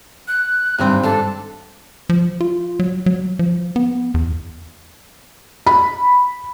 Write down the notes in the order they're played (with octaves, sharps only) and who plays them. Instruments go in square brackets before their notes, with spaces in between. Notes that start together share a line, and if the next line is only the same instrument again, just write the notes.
[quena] F#6
[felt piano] G#1 G2 [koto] C3 E3 C4
[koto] D4 [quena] A4
[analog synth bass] F3
F4
F#3
F#3
F3
B3
E2
[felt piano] B5